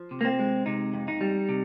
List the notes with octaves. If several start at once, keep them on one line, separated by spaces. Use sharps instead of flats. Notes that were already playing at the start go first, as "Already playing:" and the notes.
Already playing: F3
C3
A#3
C4
G#3
C3 D#4
F2
D#4
G3
C3